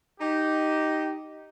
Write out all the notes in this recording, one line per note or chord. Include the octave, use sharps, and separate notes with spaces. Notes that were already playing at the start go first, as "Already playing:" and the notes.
D#4 G4